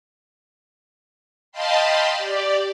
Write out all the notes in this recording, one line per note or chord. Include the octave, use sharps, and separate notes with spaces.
D#5 F5 G5 A5 B5 C6
G4 D5